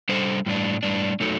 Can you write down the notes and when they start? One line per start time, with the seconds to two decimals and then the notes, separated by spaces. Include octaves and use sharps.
0.09 G3 D4 A4 C5
0.46 A2 G3 D4
0.83 A2 G3 D4
1.20 F#3 A3 D#4 A4